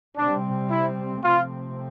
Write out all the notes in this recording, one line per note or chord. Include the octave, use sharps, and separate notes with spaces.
C3 G3 C4 D4
E4
C3 F3 A3 C4 F4